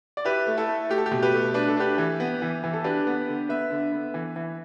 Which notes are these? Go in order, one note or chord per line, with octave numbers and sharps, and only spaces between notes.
D5
E4 G4 B4
A3
E4 A4
A3
A3 G4
A4
G4
B2
G4 B4
A3
D4 B4
A4
D4 G4 B4
E3
B3
E3
E3
A4
D4 G4 B4
B3
D3
B3 B4 E5
D3
B3
E3
E3